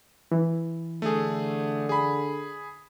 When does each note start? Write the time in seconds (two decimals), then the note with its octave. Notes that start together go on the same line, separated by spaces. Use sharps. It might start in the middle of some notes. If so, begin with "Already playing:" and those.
0.32 E3
1.02 D3 A3 G#4
1.89 G#4 B5